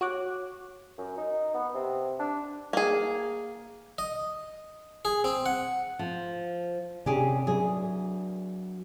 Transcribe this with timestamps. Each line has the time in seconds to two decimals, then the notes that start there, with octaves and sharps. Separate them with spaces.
0.01 F#4 C#5 D6 F#6
0.98 F#2
1.18 D#4
1.54 B3
1.75 C3
2.20 D4
2.73 A#3 G#4
3.98 D#5
5.05 G#4
5.24 C4
5.46 F#5
5.99 F3
7.06 C3 C#4 D4 G4 G#4
7.47 F#3 C#4 D4 G#4